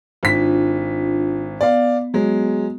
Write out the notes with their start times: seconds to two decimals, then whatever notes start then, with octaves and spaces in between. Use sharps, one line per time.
0.23 G#1 D4 F4 B6
1.61 B3 D5 F5
2.14 F#3 G#3